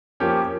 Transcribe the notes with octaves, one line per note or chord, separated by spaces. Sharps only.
F3 A#3 C#4 G4